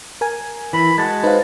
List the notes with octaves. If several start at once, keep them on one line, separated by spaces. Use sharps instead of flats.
A#4 G#5
E3 B5
G#3 F#4 A5
D#4 B4 C5 F5